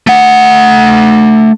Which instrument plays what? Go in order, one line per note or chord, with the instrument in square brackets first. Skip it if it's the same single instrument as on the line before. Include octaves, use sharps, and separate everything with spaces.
[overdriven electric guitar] A3 F#5